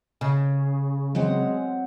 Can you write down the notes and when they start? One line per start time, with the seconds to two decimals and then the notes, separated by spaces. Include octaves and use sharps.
0.21 C#3
1.15 F#3 G#3 C4 F#5